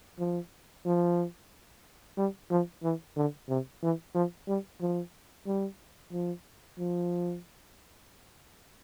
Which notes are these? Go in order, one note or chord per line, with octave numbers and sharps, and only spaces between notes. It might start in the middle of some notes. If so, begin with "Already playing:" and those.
F3
F3
G3
F3
E3
D3
C3
E3
F3
G3
F3
G3
F3
F3